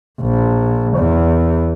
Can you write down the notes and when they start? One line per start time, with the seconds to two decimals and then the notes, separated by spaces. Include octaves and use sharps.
0.21 A#1
0.97 E2